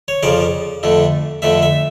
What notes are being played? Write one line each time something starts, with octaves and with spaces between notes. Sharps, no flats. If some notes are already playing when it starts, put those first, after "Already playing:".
C#5
F2 C#3 F3 D5
F2 D3 A3
F2 D3 A3 E5
E5